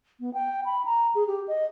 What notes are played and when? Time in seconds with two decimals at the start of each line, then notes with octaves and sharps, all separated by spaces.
0.20 B3
0.34 G5
0.65 B5
0.85 A#5
1.15 G#4
1.28 G4
1.48 D#5